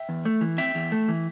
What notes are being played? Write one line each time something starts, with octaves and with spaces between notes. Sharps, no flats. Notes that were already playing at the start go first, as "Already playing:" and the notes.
Already playing: E5 G5
E2
A3
E3
C4 E5 G5
E2
A3
E3